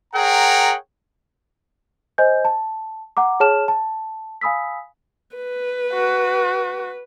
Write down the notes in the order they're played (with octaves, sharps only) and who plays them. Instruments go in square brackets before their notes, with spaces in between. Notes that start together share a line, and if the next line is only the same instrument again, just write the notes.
[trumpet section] G#4 A#4 C#5 F#5 G5 A#5
[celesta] C5 D#5 G#5 G6
A5
F#5 A#5 D6
G#4 C#5 A5 F6 E7
A5
F5 G#5 B5 D#6 E6 B6
[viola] B4
[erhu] F#4